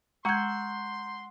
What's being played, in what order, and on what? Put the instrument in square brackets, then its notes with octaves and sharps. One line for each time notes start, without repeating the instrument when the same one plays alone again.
[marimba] G#3 G#6 [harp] F#5 C#6 E6 [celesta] A#5 G6 [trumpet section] C6